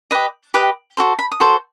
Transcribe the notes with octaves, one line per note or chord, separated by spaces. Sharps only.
G4 B4 D#5
G4 B4 D#5 G5
F#4 A4 C5
B5
D#6
F#4 A4 C5 C6